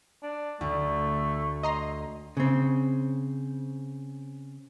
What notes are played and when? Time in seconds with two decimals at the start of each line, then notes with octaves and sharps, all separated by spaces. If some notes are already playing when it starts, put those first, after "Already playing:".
0.23 D4
0.61 D2 A3
1.63 D#5 A#5 C6
2.37 C#3 C4